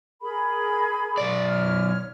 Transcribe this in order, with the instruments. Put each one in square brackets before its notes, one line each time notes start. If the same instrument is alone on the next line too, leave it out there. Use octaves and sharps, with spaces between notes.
[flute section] G#4 A#4 B5
[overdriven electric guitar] B1 D5
[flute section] C#5 F6